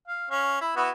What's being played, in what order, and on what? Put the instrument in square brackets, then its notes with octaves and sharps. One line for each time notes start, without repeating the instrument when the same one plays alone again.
[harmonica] F5
C#4 F5
E4
B3 E4 F#4